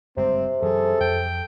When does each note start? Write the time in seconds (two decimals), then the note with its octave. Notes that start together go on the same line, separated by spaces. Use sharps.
0.17 F#1 G2 C3 G#3 C4
0.62 F#2 E3 F#3 G#4 A4
1.00 F2 G5